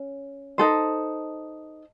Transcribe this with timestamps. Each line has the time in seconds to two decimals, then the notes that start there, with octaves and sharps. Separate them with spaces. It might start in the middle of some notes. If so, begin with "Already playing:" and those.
Already playing: C#4
0.58 D#4 A4 C5